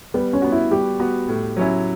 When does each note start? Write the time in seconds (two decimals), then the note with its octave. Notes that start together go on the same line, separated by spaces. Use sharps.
0.14 G3 B3
0.33 C#4
0.42 B3 F#4
0.52 E4
0.71 G3 G4
1.00 B3 F#4
1.28 A2
1.57 F#3 C#4 E4